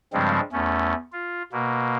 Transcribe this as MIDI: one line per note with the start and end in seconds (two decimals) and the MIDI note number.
0.13 0.40 43
0.13 0.40 49
0.13 0.40 53
0.13 0.40 55
0.13 0.40 56
0.13 0.40 60
0.52 0.94 40
0.52 0.94 57
0.52 0.94 61
1.12 1.42 65
1.52 1.98 47
1.52 1.98 58